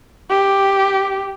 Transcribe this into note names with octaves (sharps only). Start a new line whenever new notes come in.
G4